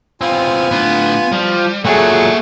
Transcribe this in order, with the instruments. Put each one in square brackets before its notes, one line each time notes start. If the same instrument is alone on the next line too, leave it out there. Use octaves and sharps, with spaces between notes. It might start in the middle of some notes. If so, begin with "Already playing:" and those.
[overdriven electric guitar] B3 C4 [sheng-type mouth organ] F4 G#5
[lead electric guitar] A2 D4 [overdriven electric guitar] B3
[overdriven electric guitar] F3 [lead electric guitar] G3
[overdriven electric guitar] A#2 F#3 [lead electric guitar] A#3 E5 [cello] G#4 A4 [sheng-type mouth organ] F#5 C#6